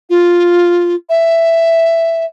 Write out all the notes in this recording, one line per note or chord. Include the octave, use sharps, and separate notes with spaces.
F4
E5